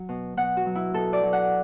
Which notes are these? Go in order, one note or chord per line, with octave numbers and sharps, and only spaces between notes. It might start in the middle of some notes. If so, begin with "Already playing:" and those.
Already playing: F#3
B2
B2 F#5
F#4
F#3
E4
B2 A4
D5
F#3
F#5